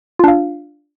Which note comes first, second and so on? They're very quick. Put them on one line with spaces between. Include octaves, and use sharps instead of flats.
F4 D4 F5